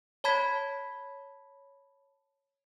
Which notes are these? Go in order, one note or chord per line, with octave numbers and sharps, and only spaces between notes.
C#5 A5 B5 G#6 B6